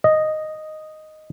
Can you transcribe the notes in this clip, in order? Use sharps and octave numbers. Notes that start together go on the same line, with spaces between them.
D#5